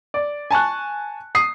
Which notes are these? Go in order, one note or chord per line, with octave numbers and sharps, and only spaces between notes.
D5
G#5 A5 C#6 F#6
D#6 C7